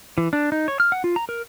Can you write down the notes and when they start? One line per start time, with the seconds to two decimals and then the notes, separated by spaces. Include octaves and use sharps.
0.18 E3
0.33 D4
0.52 D#4
0.68 C#5
0.80 F6
0.92 F#5
1.04 F4
1.16 A#5
1.29 A#4